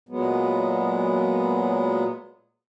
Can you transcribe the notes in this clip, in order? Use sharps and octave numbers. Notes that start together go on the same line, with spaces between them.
A#2 F#3 G#3 B3